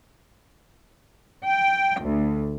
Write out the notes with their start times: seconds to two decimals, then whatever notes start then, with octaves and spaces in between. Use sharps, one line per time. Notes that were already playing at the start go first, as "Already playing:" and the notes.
1.43 G5
2.02 D2